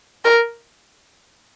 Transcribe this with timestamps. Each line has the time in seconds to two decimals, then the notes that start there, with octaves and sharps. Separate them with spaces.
0.25 A#4